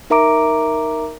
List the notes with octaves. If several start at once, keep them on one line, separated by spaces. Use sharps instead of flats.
D#4 A#4 E5 A#5 D6 D7